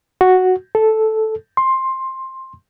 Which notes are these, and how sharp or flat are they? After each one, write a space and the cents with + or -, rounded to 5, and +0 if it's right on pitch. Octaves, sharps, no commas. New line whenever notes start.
F#4 +0
A4 -5
C6 +15